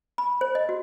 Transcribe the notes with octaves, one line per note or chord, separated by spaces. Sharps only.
B5
C5
D#5
F#4